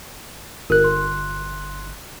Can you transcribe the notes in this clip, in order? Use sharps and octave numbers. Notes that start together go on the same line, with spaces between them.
G1 A#4 F#6
C6